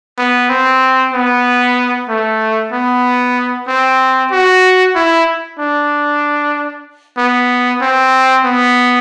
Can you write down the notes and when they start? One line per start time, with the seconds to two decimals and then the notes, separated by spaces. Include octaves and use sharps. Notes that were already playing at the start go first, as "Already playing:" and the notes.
0.18 B3
0.50 C4
1.14 B3
2.09 A3
2.72 B3
3.67 C4
4.31 F#4
4.95 E4
5.58 D4
7.17 B3
7.81 C4
8.45 B3